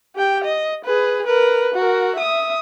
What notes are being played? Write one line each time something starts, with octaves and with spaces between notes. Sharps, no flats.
G4 G5
D#5
G#4 B4
A#4 B4
F#4 A#4
E5 D#6